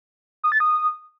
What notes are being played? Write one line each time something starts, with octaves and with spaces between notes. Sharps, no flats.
D#6
A6
D#6